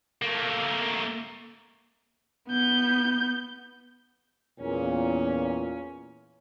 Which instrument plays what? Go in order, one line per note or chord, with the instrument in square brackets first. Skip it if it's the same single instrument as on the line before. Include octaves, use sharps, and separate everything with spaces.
[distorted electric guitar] A3 A#3
[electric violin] B3 G6
[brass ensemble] E2 A#2 [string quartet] C#4